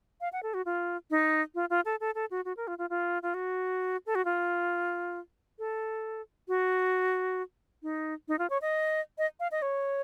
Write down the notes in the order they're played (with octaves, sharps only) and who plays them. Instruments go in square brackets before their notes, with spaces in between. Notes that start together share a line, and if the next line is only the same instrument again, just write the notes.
[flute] F5
F#5
A4
F#4
F4
D#4
F4
F4
A4
A4
A4
F#4
F#4
A#4
F4
F4
F4
F4
F#4
A4
F#4
F4
A4
F#4
D#4
D#4
F4
C#5
D#5
D#5
F5
D#5
C#5